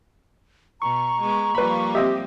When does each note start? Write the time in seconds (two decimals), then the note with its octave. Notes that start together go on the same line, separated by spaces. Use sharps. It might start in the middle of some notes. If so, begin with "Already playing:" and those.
0.82 B2 A#5 C#6
1.21 G#3 B3
1.55 F3 G3 A#3 B4 B5
1.95 C4 G4 D#5 E5